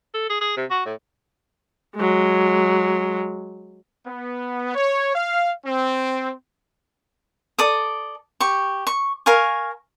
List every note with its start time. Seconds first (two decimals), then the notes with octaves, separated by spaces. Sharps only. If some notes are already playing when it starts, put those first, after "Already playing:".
0.14 A4
0.29 G#4
0.41 G#4
0.57 C3
0.70 F#4
0.85 A2
1.95 F#3 G#3
4.06 B3
4.75 C#5
5.13 F5
5.65 C4
7.58 A4 D5 D#6
8.40 G4 C#6
8.87 C#6
9.26 A#4 F5 G#5 C#6